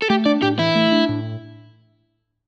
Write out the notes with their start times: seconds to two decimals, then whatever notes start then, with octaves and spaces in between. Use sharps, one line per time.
0.02 A4
0.10 A3 G4
0.26 D4 D5
0.42 A2 G4
0.59 E3 E4
0.75 A3
0.92 D4
1.09 A2